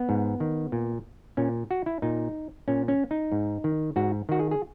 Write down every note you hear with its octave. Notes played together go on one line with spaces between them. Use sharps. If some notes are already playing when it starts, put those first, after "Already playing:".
Already playing: B3
G#2
D#3
A#2
A#2 C#4
F#4
E4
A#2 D#4
A#2 C#4
C#4
D#4
G#2
D#3
G#2 F#4
D#3 F#4
G#4
G#4